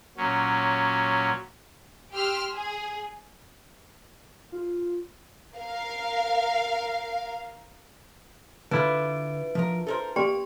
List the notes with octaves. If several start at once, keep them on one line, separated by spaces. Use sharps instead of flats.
A#2 F#3 C#4
G4 C6 E6 F6
G#4
F4
A#4 F5
D3 D4 E4 F4 B4
F3 A#4
A4 A#4 C5
A#3 G4 D5 G5 C6